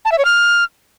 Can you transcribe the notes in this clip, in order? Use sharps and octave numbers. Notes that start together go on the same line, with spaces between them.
A5
E5
C#5
F6